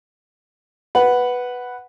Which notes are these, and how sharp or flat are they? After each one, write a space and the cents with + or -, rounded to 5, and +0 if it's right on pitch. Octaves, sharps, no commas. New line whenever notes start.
B4 +0 F#5 +0